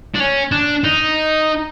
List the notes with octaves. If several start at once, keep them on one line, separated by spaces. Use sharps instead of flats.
D4
C#4
D4
D#4